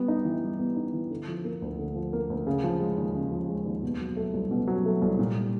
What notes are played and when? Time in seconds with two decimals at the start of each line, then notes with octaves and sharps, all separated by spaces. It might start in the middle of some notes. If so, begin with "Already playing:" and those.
Already playing: G3 B3
0.08 D#4
0.25 E3
0.43 G3
0.59 B3
0.76 D#4
0.93 E3
1.11 D3
1.28 F3
1.44 A#3
1.62 D2
1.79 D3
1.95 F3
2.13 A#3
2.30 D2
2.47 C#3
2.64 F3
2.80 G#3
2.98 D#2
3.14 C#3
3.31 F3
3.49 G#3
3.66 D#2
3.83 B2
4.00 F#3
4.17 A3
4.34 C2
4.51 B2
4.68 F#3
4.85 A3
5.02 C2
5.19 A#2
5.36 G3